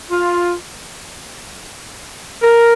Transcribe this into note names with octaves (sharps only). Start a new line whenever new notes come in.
F4
A#4